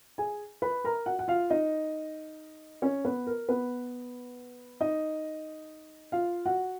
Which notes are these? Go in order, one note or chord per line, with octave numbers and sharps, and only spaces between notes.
G#4 G#5
B4 B5
A#4 A#5
F#4 F#5
F#5
F4 F5
D#4 D#5
C#4 C#5
B3 B4
A#4
B3 B4
D#4 D#5
F4 F5
F#4 F#5